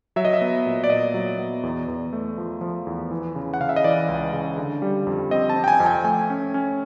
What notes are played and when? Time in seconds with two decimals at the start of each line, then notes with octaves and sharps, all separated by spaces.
0.16 F#3 E5
0.25 D#5
0.34 E5
0.41 B3
0.66 A#2
0.84 D5
0.90 A#2 D#5
1.14 F#3
1.39 B3
1.63 E2
1.88 E2
2.13 A3
2.38 F3
2.61 F3
2.87 E2
3.11 E3
3.35 C#3
3.54 F#5
3.60 C#3 F5
3.69 E5
3.76 D#5
3.84 E3 D5
4.08 C#2
4.33 C#3
4.58 D3
4.82 G3
5.07 F2
5.31 C4 D#5
5.50 A5
5.56 C4
5.64 G5
5.68 G#5
5.80 F2
5.86 G5
6.04 A3 G#5
6.30 C#4
6.54 C#4